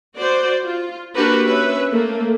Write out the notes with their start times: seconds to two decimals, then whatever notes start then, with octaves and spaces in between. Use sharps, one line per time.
0.17 F#4 C5 D5
0.65 F4
1.14 A#3 D4 F#4 G4 A#4 B4
1.46 C#4 B4 E5
1.90 A3 A#3